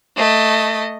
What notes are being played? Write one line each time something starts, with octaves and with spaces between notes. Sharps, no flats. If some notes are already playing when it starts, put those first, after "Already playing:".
A3 D#5